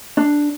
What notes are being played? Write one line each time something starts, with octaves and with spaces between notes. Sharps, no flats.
D4